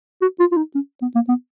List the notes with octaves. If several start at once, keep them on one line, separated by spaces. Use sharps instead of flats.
F#4
F4
F4
D#4
C#4
B3
A#3
B3